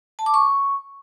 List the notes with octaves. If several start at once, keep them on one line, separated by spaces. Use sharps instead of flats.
A5
D6
C#6